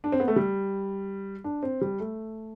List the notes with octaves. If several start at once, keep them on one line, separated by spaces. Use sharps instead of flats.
D4
C4
B3
A3
G3
D4
C4
G3
A3